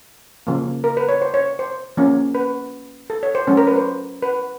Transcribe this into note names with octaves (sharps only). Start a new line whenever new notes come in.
C#3 F3 A#3
A#4
B4
C#5
C5
C#5
C5
F3 A#3 C#4
B4
A4
C#5
C5
F#3 A3 C#4 C5
A#4
B4
C5
B4